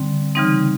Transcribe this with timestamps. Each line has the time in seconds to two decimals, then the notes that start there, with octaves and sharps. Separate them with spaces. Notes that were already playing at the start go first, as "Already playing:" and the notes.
Already playing: D3 G3 C4
0.35 C#3 E3 G3 C4 D#4